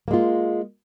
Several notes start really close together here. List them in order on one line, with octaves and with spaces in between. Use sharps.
A#3 G#3 F4